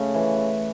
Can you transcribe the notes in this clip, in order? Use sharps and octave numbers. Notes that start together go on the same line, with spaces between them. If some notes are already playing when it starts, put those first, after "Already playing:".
Already playing: C#3 A3
E3